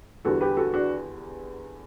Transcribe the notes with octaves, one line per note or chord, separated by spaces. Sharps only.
E2 D3 G3 F#4 A4
G4 B4
F#4 A4
D4 F#4